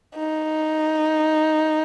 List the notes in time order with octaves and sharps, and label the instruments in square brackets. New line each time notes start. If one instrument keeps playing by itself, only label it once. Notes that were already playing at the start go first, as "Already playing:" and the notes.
[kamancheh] D#4